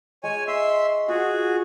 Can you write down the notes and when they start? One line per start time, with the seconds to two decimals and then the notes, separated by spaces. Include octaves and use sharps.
0.24 G#3 C#5 G#5
0.48 E5 C6 C#6 E6
1.08 F4 F#4 G#4 F#5